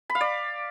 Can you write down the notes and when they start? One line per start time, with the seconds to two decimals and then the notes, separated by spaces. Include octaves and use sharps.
0.10 B5
0.15 F5
0.21 D5